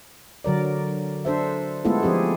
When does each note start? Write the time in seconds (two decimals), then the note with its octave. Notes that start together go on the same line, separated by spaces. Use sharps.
0.44 D3 F#3 A#4 D5
1.25 D4 A4 C5 E5
1.85 G#3 A3 B3 E4 F4 A4
2.03 F3 C4 G4 G#4